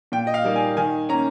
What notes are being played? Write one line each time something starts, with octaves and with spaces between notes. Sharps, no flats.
A#2 G5
D#5
F5
G3 A#3 D#4
G#5
D#3 G#5
A#3 C#4 A#5